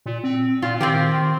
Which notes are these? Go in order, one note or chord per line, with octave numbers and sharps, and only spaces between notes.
A#2
C4
A#2 F4
D#3 C4 F4 G4